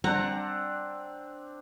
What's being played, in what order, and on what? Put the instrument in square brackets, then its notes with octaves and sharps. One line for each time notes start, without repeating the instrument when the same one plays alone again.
[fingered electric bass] G3 [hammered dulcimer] C4 D4 [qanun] F#5 A#5